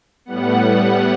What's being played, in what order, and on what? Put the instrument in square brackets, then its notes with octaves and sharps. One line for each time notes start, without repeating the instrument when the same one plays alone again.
[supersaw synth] A2 G3 B3 F#5